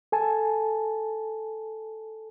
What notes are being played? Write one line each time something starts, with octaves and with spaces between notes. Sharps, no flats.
A4 G#5 A5